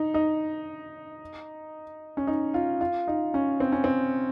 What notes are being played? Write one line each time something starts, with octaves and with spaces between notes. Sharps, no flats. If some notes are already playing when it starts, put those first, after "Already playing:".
Already playing: D#4
D#4
C#4
D#4
F4
F4
D#4
C#4
C4
C#4
C4